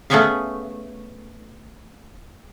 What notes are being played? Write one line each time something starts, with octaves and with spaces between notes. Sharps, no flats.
A3 B3 C#4 G#4 E5 F5